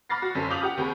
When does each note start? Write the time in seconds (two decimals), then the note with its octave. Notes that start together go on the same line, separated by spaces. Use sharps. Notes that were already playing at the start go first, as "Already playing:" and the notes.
0.09 B5 D6 F6 A6 A#6 C7
0.22 F#4
0.35 G1 F#2 C#4 A4 C5 B6
0.50 F4 D6 D#6 G6 F7 F#7
0.63 G4 F#5
0.77 D#2 C4 G4 G#4 B5